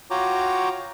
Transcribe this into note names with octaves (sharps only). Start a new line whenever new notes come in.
F4 F#4 C#5 G5 A#5 D6